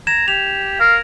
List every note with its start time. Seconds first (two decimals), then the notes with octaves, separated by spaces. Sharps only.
0.07 A#5 G#6 E7
0.28 G4 F7
0.80 A#4 F5